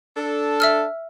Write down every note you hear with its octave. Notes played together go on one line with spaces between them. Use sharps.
D4 A4
E5 E6 F6